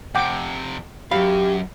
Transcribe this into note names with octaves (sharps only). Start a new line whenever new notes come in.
F2 C3 F#5 G5 D6
F#2 F#3 G4 F5 B5